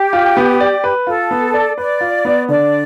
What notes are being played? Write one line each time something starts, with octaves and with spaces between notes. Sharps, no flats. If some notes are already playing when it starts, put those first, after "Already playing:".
Already playing: G4
F4
B3
D5
B4
F4 A4
B3
D5
B4 D5
F4
B3
D3 D5